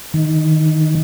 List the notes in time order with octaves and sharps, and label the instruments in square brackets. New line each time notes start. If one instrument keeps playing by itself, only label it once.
[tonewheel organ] D#3